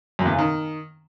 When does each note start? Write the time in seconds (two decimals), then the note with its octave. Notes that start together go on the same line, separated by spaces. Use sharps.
0.19 F#2
0.26 E2
0.32 C#3
0.39 D#3